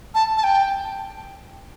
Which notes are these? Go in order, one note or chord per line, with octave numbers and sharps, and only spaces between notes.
A5
A5
G5